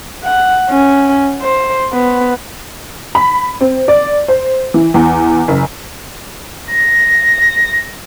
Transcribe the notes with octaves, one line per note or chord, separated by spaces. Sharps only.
F#5
C#4
C5
B3
B5
C4
D5
C5
E3
E2
F#1
A#6